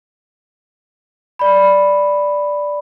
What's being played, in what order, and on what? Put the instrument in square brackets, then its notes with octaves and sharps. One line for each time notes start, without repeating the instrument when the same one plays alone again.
[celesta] D5 B5